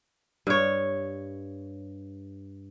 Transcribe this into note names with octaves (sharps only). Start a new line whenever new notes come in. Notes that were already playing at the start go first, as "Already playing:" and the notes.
G2 C#5